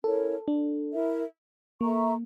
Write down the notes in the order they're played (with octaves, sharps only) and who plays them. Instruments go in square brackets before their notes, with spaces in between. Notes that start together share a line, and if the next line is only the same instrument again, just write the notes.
[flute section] C#4 E4 A#4 C#5 [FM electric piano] A4
[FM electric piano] D4
[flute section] E4 A#4 E5
[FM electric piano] A#3 [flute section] A4 E5 A#5 C#6